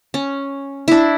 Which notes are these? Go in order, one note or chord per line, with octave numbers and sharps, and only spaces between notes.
C#4
D4 E4